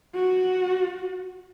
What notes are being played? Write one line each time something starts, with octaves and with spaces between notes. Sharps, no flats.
F#4